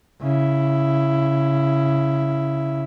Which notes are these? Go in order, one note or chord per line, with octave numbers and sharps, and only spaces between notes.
C#3 E4